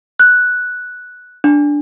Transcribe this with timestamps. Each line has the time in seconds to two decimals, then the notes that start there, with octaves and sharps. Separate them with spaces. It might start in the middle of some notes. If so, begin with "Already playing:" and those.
0.19 F#6
1.44 D4